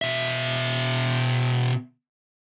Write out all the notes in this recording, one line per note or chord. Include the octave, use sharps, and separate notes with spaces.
B2 E5